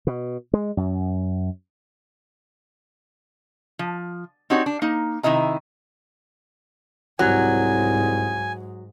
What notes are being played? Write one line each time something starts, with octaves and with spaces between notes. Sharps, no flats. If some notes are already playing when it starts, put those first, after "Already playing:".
B2
G#3
F#2
F3
C4 D4 D#4 F#4 G4 C#5
D4
A#3 D#4
C3 D#3 E4 D#5 A#5
C2 G#2 F#3 G#5